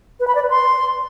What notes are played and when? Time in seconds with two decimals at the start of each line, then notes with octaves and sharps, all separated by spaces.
0.20 B4
0.28 B5
0.35 D5
0.43 B4
0.50 C6